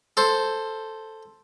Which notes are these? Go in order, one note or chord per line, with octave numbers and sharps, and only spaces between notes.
A4 C5